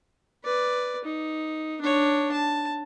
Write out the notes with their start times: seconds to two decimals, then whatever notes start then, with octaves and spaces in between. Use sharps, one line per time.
0.44 B4 D5
1.04 D#4
1.81 D4 C#5
2.32 A5